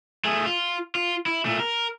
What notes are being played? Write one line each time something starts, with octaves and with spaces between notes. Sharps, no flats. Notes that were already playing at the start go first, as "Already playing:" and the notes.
A3 G#4
F4
F4
E4
A#2 A3
A#4